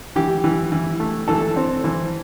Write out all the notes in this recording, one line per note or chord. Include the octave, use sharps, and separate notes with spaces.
E3 G4
E3
E3
A3
E3 A4
C4
E3